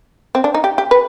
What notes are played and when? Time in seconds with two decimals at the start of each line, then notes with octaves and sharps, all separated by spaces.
0.35 C4
0.44 D4
0.54 D#4
0.64 G4
0.78 G4
0.91 B4